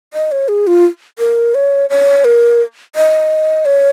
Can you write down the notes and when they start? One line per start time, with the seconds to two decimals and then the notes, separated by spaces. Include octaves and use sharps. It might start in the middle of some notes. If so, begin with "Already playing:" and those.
0.14 D#5
0.32 C#5
0.48 G#4
0.67 F4
1.19 A#4
1.55 C#5
1.90 C#5
2.25 A#4
2.96 D#5
3.65 C#5